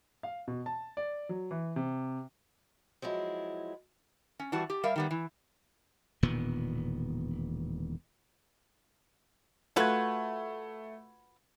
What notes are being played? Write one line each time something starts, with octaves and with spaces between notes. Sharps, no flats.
F5
B2
A5
D5
F#3
E3
C3
F3 F#3 G#3 E4
C#4
E3 G3 F#4 A5
G4
G3 A#4 E5 F5
D#3 G3 B3
E3
E1 A#2 D#3 B3
A3 F4 F#4 B4 G#6